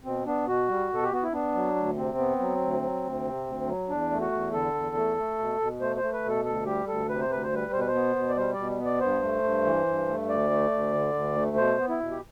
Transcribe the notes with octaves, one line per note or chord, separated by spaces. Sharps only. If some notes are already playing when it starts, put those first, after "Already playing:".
B2 C4
B3 D4
B2 F#4
G3
B2 A4
G4
B3 F#4
E4
B3 D4
F#3
D2
C3 C4
B3
F#3
D2
F#3
D2
C3
D2
F#3
E2 D4
A3
F#4
E2
D3 A4
E2
A3
A3
B2
B2
A3 C5
C5
A3
B4
B2 A4
D2 A4
G3 G4
D2 A4
C3 B4
C5
D2 B4
C5
G3 B4
B2 C5
B4
C5
B3
B2
D5
G3 C5
B2 D5
B3
D5
G2 C5
A3
G2
E3
G2
A3
D2 D5
A3
D2
D3
D2
A3
B2 C5
B3
E4
B2
G4